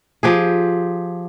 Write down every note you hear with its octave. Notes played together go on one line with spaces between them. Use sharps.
F3 G4 G#4